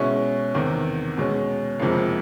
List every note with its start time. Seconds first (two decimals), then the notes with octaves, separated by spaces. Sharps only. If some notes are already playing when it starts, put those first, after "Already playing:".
Already playing: B2 G#3 C#4 E4
0.54 E2 C3 D#3
1.17 B2 G#3 C#4
1.80 F#1 F2 C3 F3 G#3